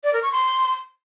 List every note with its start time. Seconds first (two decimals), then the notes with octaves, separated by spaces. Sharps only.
0.04 D5
0.13 A#4
0.23 C#6
0.32 C6